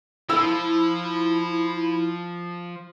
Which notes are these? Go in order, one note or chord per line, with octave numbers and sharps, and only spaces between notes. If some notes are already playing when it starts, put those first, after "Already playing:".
F3 E4 E6